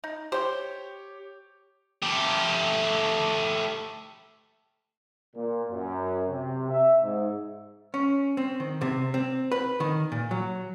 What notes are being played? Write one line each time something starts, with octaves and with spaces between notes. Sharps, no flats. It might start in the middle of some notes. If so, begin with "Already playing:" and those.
D#4
G4 C5 C#5 G5
A3 G4
A#2
F#2
C3
E5
G#2
C#4
C4
D#3
C3
C4
B4
D#3
A#2
F#3